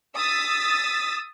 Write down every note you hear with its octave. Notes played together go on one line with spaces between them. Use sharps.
D#6 E6 A6 B6